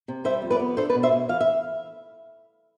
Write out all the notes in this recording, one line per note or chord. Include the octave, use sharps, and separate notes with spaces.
C3
G3 C5 E5
F2
B4 D5
B3
D4 A4 C5
B4 D5
B2
C5 E5
B2
E3 F5
E5